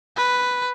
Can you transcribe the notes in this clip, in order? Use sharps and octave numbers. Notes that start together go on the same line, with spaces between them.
B4